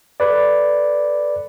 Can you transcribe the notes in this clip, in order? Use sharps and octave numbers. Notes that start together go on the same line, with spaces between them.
A4 B4 D5